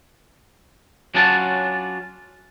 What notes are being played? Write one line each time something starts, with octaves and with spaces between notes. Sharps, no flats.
F#3 C#4 D4 F4 F#5 A5